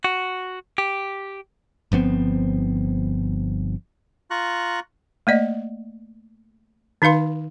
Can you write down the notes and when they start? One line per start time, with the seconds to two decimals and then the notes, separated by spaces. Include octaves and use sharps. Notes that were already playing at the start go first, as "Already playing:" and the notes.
0.04 F#4
0.78 G4
1.92 G1 F3 B3 C4
4.31 F4 A#5 C#6 F#6
5.27 A3 A#3 D5 D#5
7.02 D#3 D#4 B4 F5 C6